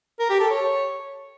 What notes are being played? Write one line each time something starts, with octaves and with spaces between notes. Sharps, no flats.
A#4
G4
A4
C#5